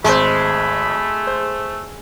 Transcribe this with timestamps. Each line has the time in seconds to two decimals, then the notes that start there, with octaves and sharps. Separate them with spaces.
0.04 G#1 G#3 A3 C5 B5
1.27 C5